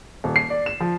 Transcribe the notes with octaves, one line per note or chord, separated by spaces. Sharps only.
D#1
C7
D5
E7
F3